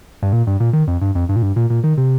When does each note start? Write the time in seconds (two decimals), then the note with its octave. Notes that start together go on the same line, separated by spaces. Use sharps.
0.22 G2
0.33 A#2
0.47 G2
0.60 A#2
0.73 D#3
0.87 F2
1.01 G2
1.15 F2
1.29 G2
1.36 A#2
1.42 G2
1.56 A#2
1.70 A#2
1.84 D#3
1.97 C3